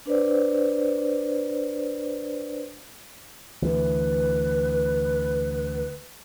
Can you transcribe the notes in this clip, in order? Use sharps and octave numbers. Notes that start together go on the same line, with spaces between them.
D4 B4 C5 D5
D2 E3 B4